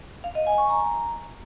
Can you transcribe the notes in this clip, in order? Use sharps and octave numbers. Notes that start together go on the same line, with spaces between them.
F5
D#5
G#5
C#6
A#5